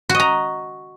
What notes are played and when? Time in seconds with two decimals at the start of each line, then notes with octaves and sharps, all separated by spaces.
0.09 F#4
0.14 D#5
0.20 A#5